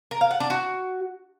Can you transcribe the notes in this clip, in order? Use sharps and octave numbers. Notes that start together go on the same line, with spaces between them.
A#4
F5
F#5
D4
F#4